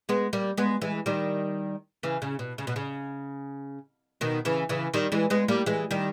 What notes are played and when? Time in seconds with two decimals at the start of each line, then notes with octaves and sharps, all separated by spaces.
0.09 G#3 B3
0.33 G3 A#3
0.58 G#3 B3
0.81 E3 G#3
1.06 D#3 G3
2.03 C#3 E3
2.22 C#3
2.39 B2
2.58 C#3
2.67 B2
2.76 C#3
4.21 B2 D#3
4.45 C#3 E3
4.69 C#3 E3
4.94 D#3 G3
5.12 E3 G#3
5.30 G#3 B3
5.48 G3 A#3
5.66 E3 G#3
5.91 D#3 G3